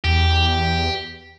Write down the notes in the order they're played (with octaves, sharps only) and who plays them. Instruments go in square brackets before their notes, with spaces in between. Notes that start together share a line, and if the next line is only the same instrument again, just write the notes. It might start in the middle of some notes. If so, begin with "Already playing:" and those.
[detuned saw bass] E2 [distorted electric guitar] G4